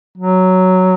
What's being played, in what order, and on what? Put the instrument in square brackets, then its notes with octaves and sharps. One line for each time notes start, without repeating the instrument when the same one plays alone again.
[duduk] F#3